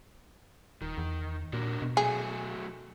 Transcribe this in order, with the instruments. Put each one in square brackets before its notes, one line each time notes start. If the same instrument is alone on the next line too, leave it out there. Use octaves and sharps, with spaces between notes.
[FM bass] D#1 [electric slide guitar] D#3
[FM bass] E2
[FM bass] A#2 [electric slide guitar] D4 F#4 A#4
[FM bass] B2
[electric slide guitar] F#3 A3 [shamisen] G#4